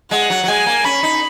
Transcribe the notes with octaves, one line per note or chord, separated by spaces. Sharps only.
G#3 F#5
F#3
F#3
G#3 G#5
A#3
C#4 B5
D#4